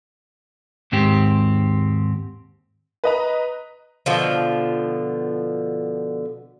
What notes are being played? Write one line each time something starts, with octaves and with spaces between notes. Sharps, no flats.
D#2 G#2 C4 G4
B4 D#5 A#5
B2 D3 F3